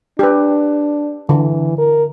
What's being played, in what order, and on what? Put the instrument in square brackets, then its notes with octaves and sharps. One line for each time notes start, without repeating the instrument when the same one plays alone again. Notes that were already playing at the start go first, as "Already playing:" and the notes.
[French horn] D4 [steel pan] G4 B4
[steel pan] D3 [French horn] E3
[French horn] A#4